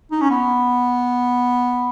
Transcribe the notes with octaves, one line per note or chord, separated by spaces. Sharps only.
D#4
C#4
B3